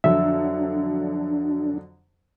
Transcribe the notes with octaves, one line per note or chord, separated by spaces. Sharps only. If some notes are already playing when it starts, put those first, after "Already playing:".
F2 D3 F#3 D4 E5 E6